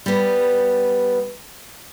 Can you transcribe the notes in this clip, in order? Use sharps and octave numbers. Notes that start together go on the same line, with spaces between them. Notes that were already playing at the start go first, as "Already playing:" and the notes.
G3 B3